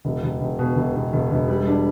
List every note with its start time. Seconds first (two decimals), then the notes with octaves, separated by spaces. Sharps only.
0.05 E1
0.23 E1
0.41 E1
0.59 B2
0.76 E1
0.95 E1
1.13 E1
1.31 E1
1.48 G3
1.67 D4